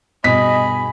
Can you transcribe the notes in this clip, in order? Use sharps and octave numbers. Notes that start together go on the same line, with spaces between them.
G2 B2 G#4 D#5 B5 B6